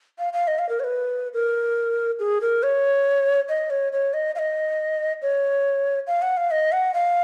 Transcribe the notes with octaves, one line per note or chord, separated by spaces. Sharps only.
F5
F5
D#5
F5
A#4
C#5
B4
A#4
G#4
A#4
C#5
D#5
C#5
C#5
D#5
F5
D#5
C#5
F5
F#5
F5
D#5
F#5
F5